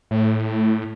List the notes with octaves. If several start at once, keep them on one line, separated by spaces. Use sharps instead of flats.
A2